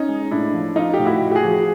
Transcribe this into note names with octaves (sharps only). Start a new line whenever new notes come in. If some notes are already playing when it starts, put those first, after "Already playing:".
Already playing: C#4 D#4
G#3
A2 D4 E4
F3
F3 D#4 F4
G4
A2
E4 F#4
A2
G4
F#4 G#4
F3